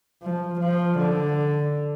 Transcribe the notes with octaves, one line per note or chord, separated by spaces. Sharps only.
F3
F3
D3